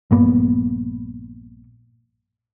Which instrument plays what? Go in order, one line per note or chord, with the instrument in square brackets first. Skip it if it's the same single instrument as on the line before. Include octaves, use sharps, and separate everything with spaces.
[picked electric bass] A#1 G2 A#3 B3